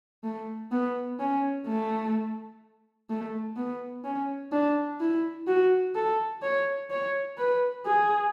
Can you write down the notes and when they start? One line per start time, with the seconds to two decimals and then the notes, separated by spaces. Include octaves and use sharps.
0.24 A3
0.71 B3
1.19 C#4
1.67 A3
3.10 A3
3.57 B3
4.04 C#4
4.52 D4
5.00 E4
5.47 F#4
5.95 A4
6.42 C#5
6.90 C#5
7.38 B4
7.86 G#4